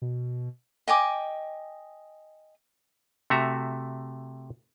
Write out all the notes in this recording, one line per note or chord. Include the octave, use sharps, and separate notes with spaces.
B2
D#5 G5 G#5 D6
C3 A3 F#4 E5 A#5